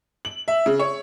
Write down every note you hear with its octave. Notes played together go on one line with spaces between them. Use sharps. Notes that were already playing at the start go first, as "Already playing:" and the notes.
F#7
E5
C#3
C#5